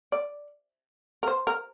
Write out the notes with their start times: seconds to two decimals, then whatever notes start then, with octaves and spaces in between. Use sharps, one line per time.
0.12 D5
1.23 A#4
1.28 C5
1.47 A#4